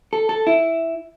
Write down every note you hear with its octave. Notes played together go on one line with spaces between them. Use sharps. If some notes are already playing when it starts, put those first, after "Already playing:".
A4
A4
E4